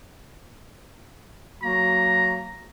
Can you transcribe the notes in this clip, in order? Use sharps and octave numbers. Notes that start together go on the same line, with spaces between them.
F#3 A#3 F#4 A#5